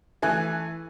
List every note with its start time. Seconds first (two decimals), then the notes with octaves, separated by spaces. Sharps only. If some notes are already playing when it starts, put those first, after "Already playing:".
0.22 E3 A3 G#5 F#6